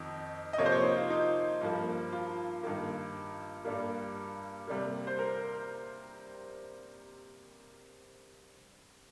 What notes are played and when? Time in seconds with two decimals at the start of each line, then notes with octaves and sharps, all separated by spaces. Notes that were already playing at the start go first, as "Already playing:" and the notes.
Already playing: F2 D#3
0.53 D#5
0.58 C3 F3 A#3 C#5
0.66 C5
0.72 C#5
0.84 D#4
0.96 F4
1.10 D#4
1.61 G2 F3 A#3
2.12 F4
2.63 G2 D#3 A#3
3.65 G2 G3 A#3
4.67 C3 G3 A#3
5.07 C5
5.19 A#4